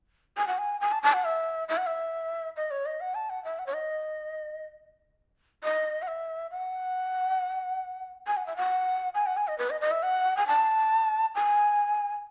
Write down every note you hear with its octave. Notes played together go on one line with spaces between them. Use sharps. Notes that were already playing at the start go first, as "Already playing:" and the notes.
G#5
F#5
G#5
G#5
A5
A5
F#5
E5
E5
F#5
E5
D#5
C#5
D#5
F#5
A5
F#5
E5
F#5
C#5
D#5
D#5
F#5
E5
F#5
G#5
F#5
E5
F#5
G#5
F#5
G#5
D#5
B4
D#5
D#5
E5
F#5
G#5
A5
G#5